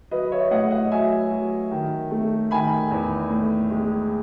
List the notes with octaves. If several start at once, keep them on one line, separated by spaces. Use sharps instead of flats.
F#3 B4 D#5
C#5 E5
A2 D#5 F#5
D#5 F#5
F#3 E5 G#5
F#3
D#3
A3
D#3 G#5 B5
E2
A2
G#3